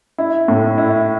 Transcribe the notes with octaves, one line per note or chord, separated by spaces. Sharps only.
E4
A2
E4